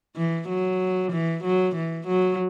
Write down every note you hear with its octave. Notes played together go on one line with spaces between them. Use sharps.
E3
F#3
E3
F#3
E3
F#3